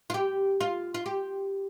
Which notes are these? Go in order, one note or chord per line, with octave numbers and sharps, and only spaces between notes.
F4
G4
F4
F4
G4